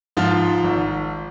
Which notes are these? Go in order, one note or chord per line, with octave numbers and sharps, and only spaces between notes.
G#2 F3 F4
G#1